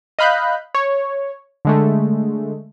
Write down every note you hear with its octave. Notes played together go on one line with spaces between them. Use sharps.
D#5 F5 B5 F#6 G6
C#5
D3 G#3 A3